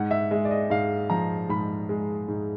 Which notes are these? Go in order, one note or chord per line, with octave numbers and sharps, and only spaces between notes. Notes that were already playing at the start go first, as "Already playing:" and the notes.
Already playing: G#2 F#5
E5
G#3 E5
D5
D#5
G#2 F5
F3 A#5
G#2 B5
G#3
G#2